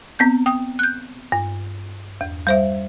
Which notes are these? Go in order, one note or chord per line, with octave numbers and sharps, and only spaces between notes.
B3 C4 G6
G5 D#6
F#6 G6
G2
E2
G3 C5 E5